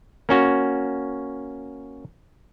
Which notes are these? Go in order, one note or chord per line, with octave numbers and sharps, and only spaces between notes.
A#3 C#4 F#4